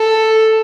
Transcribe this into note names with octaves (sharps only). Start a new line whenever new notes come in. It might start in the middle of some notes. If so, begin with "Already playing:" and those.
Already playing: A4